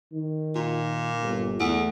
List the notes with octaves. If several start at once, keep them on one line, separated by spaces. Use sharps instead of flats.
D#3
A#2
G1
E2 A3